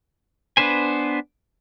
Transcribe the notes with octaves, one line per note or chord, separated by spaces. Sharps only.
B3 D4 B4 C5 G#5